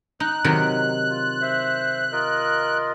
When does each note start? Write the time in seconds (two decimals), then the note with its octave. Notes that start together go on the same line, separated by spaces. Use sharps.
0.20 D#4 F#6
0.44 C3 D#3 F#3
1.10 F4
1.41 C5 E5
2.12 F4 A#4 D#5